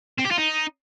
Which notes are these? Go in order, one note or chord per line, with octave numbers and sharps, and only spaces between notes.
C4
G4
F4
D#4